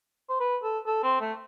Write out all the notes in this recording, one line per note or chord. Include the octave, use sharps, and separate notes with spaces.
C5
B4
A4
A4
C4
A3